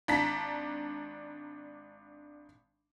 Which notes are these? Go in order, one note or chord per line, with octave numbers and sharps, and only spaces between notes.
G#1 D4 A5 A#5 B6